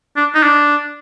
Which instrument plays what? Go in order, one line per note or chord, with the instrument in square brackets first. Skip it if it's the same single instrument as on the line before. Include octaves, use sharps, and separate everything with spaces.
[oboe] D4
D#4
D4